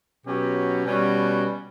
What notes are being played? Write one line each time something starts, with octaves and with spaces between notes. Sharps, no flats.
B2 F#3 C#4 G4
B2 G3 C#4 F#4